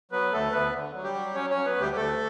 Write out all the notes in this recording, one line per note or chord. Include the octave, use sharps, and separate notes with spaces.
F#3 B3 B4
D2 A3 A4
D2 B3 B4
D3
F#3
G3 G4
F#3
F#3 C#4 C#5
C#4 C#5
F#3
B3 B4
D2
G3 G4
D2 A3 A4